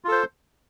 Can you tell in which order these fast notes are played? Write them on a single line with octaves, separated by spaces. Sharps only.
F4 A4 C5